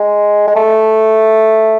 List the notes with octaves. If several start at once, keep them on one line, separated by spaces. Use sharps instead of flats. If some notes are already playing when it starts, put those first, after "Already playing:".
Already playing: G#3
G#3
A3